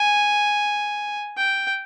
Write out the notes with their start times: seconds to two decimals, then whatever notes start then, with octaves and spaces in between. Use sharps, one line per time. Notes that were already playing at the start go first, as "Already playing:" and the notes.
Already playing: G#5
1.37 G5